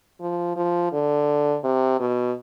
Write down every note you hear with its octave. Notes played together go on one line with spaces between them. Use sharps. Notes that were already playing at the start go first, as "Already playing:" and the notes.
F3
F3
D3
C3
B2